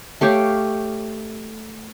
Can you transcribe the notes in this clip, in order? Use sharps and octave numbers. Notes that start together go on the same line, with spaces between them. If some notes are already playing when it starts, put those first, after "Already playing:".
A3 G4 C#5 F5